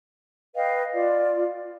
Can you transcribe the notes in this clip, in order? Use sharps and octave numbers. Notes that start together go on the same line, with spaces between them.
B4 D#5 F5 G5
F4 D5